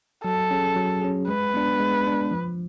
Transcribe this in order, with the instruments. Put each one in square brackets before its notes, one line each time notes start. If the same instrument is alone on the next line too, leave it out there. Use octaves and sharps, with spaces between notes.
[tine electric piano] F#3 [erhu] A4
[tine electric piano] C#4 G#4
F#3
C#4 G#4
[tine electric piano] G#3 [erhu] B4
[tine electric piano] B3 D4
G#3
B3 D4
F3